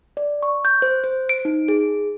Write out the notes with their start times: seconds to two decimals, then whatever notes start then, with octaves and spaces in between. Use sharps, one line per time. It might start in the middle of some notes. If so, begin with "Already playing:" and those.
0.17 D5
0.43 C#6
0.65 G6
0.82 C5
1.04 C5
1.29 D7
1.45 D#4
1.68 G#4